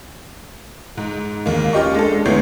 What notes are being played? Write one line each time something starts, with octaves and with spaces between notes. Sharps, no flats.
G#2
D#2 A#3
C#4 F4 G4 D#5 C#6
G#3 D4 A4
D2 B3 E4 C#5 G6 C7